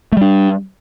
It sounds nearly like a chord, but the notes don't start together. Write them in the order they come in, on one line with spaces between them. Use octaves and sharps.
A3 G3 D4